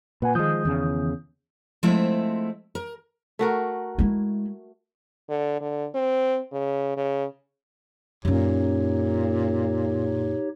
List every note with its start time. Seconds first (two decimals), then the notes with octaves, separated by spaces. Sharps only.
0.22 A#2 B4 F#5 G#5
0.35 D#3 F3 G#3 D#6 G6
0.65 E2 C#3
1.83 F3 G#3 A3 C4 E4 E5
2.75 A#4
3.39 A3 F#4 A#4
3.99 G#3 E4
5.29 D3
5.61 D3
5.95 C4
6.53 C#3
6.97 C#3
8.25 F#2 A#2 C#4 D#4 G4 C#5